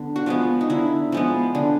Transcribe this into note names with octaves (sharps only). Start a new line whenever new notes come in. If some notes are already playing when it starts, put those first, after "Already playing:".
Already playing: D3 B3
F#4
F3 G#3 B3 F4
D#4
D3 E4
F3 G#3 B3
D3